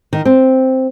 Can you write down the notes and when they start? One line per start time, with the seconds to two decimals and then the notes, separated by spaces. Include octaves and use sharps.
0.13 D#3
0.25 C4